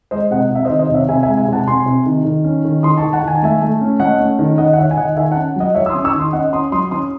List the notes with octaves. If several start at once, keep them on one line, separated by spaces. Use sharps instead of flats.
G#3 C5 D#5
C3 D#5 F#5
C3 E5
C5 D#5
D#3
C5 D#5
C3
C#5 E5
C3 E5 G#5
E5 G#5
G#3
E5 G#5
C3 F#5 A5
C3 G#5 C6
C3
D#3
D#3
C#4
D#3
D#3 C6 D#6
A5 C#6
D#3
F#5 A5
D#3 G#5
A5
A3 E5 G#5
A3
C#4
A3 D#5 F#5
C#4
D#3
D#3 D#5 F#5
F#5
D#3 C#5 E5
G#5
D#3 D#5 F#5
D#3 E5 G#5
F#5 A5
C#4
F#3 D#5 F#5
F#3 C#5 E5
E6
C6 D#6
C#4
C#6 E6
D#3
C6 D#6
C#4 D#5 F#5
C#4 C6 D#6
F#3 C6 D#6
C#4 C6 D#6